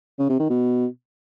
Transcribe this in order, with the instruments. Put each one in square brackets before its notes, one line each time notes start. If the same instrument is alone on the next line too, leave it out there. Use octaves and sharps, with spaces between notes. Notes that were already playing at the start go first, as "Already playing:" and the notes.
[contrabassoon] C#3
C3
D#3
B2